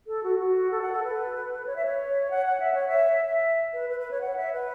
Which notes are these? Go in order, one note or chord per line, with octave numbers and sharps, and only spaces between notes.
A4
F#4
F#4
A4
F#5
A4
B4
C#5
E5
C#5
F#5
F#5
E5
C#5
E5
E5
B4
B4
B4
C#5
F#5
E5
B4